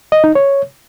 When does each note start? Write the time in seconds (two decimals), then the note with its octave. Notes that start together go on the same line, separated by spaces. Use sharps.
0.12 D#5
0.24 D#4
0.35 C#5